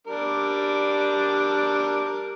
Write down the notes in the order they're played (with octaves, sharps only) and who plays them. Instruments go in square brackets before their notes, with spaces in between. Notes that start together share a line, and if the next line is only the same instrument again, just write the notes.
[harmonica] G3 D4 A#4